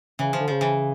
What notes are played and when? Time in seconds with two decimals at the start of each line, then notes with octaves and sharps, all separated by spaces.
0.19 C#3 E3
0.33 F3
0.40 D3
0.48 C#3 F3
0.61 E3